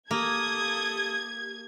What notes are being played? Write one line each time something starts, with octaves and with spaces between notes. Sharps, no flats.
A#3 G4 A4 D#6 G#6